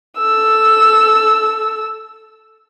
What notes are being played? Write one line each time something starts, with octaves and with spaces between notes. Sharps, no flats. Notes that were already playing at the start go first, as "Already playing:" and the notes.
A4 E6